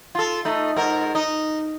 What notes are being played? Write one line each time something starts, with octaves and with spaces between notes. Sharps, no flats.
F4 A4
A3 D#4
G#2 A#4
D#4